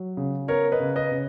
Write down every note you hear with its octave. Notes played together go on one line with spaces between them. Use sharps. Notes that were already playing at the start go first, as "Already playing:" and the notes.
Already playing: F#3
C#3
B3 A#4 C#5
B4 D#5
C#3
B4 D#5
C#3